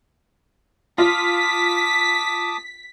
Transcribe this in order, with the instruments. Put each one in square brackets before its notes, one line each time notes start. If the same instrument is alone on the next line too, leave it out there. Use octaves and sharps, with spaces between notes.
[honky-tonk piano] F4 [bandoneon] A5 D6 D#6 [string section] B6